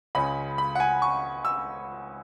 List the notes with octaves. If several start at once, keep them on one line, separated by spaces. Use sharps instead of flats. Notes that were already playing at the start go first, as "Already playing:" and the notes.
C#2 C#3 G#3 C#4 B5
B5
F#5
G#5
C#6
E6